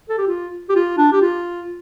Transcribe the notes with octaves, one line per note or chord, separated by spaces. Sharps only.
A4
G4
F4
G4
F4
D4
G4
F4